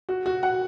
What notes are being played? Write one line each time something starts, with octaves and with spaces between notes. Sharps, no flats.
F#4
F#4
F#5